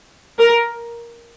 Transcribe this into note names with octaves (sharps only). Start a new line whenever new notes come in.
A#4